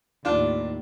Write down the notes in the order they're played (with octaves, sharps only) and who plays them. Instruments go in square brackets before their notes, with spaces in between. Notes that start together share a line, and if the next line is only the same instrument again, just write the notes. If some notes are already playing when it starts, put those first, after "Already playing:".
[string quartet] D#2 A2 [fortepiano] D4 F4